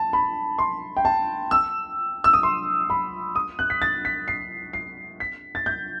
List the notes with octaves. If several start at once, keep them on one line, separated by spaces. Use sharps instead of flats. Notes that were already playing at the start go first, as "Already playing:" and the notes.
Already playing: A5
B5
C6
G5
A5
E6
E6
D#6
C6
B5
D#6
F#6
B6
A6
B6
C7
C7
B6
A6
G6